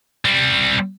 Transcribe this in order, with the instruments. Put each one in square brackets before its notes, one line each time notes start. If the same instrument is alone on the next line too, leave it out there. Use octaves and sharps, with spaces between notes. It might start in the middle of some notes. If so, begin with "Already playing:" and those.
[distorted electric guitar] G3 C4